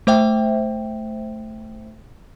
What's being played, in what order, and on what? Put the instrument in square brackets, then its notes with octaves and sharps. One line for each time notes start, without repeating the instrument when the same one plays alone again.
[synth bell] A3 C5 E5 G5